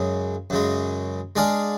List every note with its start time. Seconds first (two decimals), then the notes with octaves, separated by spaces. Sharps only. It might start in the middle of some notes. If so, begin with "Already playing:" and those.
Already playing: F#2 C#3 G#3
0.50 F#2 C#3 G#3
1.36 G#3 D4 G#4 D5 F5